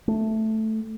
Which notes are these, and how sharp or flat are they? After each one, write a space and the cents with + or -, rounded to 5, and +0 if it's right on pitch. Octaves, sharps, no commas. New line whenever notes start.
A3 +0